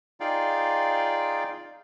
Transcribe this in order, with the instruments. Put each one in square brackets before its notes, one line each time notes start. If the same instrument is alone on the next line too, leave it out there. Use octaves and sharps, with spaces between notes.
[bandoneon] D#4 F4 G#4 D5 F5 G5